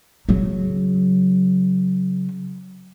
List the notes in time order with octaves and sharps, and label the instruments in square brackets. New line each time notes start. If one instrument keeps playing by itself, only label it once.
[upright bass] C#3 F#3